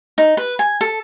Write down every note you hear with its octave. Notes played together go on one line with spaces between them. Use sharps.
D#4
B4
G#5
A4